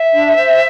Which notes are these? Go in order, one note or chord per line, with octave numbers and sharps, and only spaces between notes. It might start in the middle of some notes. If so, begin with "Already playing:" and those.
Already playing: E5
D4
C5